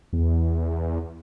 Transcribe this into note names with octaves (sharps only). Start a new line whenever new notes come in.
E2